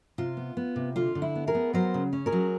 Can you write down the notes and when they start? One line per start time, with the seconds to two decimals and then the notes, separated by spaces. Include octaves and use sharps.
0.18 C3 F4
0.37 B3
0.57 B3
0.76 C3
0.96 D3 F4
1.15 D3
1.22 E4
1.35 B3
1.47 G#4 A#4
1.55 B3
1.74 F#3 A#4 C5
1.94 C#3
2.13 C#4
2.26 G#4 A#4
2.32 F#3